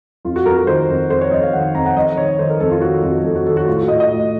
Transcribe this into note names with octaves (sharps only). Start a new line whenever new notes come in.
F2 F4
F#4
F2 A#4
A#4
D#3 C5
F2
F2 C5
C#5
F2 D#5
F5
D#3 F#5
F2 A#5
F#5
F2 D#5
D#3 C#5
D#3 C5
A#4
F2 A4
F4
D#3 F#4
F2 F#4
F2 A4
F#4
D#3 A4
F#4
A2 F4
F#4
A2 D#5
D#5
A2